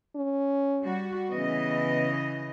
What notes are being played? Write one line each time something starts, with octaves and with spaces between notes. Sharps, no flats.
C#4
G3 F#4
C#3 E3 B3 D#5